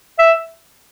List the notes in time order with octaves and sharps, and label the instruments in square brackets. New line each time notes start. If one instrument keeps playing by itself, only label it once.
[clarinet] E5